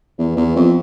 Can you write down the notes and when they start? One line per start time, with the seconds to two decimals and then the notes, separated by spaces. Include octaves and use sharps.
0.18 E2
0.37 E2
0.56 F2